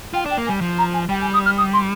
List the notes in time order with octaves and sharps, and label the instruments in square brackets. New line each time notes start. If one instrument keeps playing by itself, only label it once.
[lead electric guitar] F4 [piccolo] G5
[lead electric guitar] D4 [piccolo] G5
[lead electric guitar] A#3
[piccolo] G#5
[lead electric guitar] G3
F3
[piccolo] A#5
G#5
[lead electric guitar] G3 [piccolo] G5
[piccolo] G#5
D#6
F6
D#6
C6